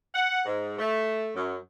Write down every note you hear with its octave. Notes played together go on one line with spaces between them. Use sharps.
F#5
G#2
A3
F#2